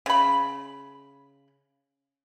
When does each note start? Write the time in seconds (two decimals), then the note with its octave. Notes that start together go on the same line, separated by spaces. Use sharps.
0.06 C#3 B5